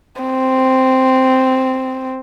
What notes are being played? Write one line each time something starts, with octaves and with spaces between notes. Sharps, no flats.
C4